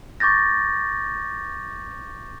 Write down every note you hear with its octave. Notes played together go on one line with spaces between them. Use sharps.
C#6 D6 G6 A6 A#6